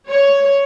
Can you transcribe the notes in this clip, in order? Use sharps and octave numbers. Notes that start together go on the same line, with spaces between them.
C#5